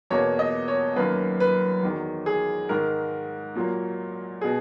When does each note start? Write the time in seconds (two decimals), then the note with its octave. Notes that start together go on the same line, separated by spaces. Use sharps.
0.10 E2 B2 A#3 C#5
0.39 D#5
0.68 C#5
0.96 F#2 D#3 A#3 B4
1.40 B4
1.83 E2 D#3 F#3
2.26 G#4
2.69 G#2 D#3 G#3 A#4
3.55 A#2 F#3 A#3
4.41 B2 G#4